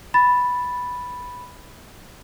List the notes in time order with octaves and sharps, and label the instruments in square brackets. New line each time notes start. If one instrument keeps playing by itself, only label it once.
[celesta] B5 A6